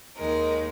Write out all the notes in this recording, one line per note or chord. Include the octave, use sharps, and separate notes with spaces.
D#2 D#3 G#3 A#4